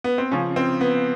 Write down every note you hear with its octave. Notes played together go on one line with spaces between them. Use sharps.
B3
C4
C#3 F3 C#4
C4
B3